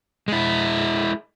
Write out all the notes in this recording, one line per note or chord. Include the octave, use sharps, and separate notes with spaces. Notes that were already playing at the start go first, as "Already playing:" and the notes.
G#3 E4